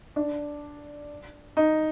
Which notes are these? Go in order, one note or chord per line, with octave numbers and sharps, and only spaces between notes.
D4
D#4